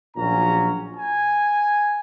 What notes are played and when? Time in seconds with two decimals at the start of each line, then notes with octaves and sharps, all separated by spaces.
0.15 A#1 A#2 F#3 C#4 A#5
0.95 G#5